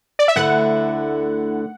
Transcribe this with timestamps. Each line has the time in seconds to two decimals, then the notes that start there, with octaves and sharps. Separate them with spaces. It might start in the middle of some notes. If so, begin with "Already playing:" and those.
0.19 D5
0.28 E5
0.36 D2 D3 A3 E4 F#5